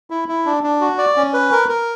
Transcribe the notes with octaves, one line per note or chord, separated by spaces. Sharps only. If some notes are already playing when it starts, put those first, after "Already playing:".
E4
E4
D4
D4
F#4
D5
C#4
B4
A#4
A#4